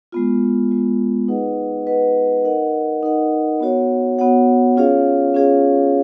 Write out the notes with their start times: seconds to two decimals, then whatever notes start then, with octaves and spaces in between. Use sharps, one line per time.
0.12 G#3 B3 F4
0.71 G#3 B3 F4
1.28 D#4 G#4 B4 D#5 F#5
1.87 D#4 G#4 B4 D#5 F#5
2.44 D#4 A#4 D#5 F#5
3.03 D#4 A#4 D#5 F#5
3.60 B3 F#4 C#5 F#5
4.19 B3 F#4 C#5 F#5
4.77 C#4 F4 G#4 C#5 F5
5.34 C#4 F4 G#4 C#5 F5